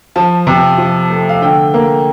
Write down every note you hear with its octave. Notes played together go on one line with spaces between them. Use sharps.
F3 A5
C3
F3
A3
F5
D3 G5
A#3